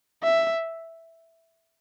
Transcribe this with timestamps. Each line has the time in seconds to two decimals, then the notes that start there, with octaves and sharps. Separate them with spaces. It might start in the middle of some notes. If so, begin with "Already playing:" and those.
0.23 E5